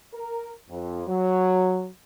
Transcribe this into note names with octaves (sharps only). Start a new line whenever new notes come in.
A#4
F2
F#3